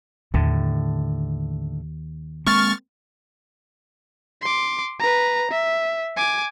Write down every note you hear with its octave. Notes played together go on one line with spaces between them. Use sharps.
D#2 A2 D3
G#3 A#3 C4 C#6 F6 A6
C6 D6
B4 A#5
E5
G#5 D6